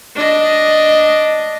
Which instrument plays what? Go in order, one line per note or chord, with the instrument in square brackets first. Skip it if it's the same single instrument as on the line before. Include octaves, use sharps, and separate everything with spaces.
[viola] D4 D#5